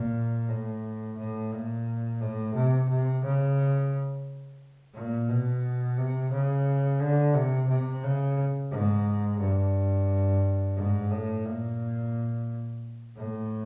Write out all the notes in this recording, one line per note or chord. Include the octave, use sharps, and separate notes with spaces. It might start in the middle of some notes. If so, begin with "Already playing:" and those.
Already playing: A#2
A2
A2
A#2
A2
C3
C3
C#3
A#2
B2
C3
C#3
D3
C3
C3
C#3
G#2
G2
G#2
A2
A#2
A2